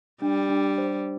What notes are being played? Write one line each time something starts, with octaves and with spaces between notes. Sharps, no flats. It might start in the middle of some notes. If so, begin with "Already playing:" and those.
G3 D4
D4
C5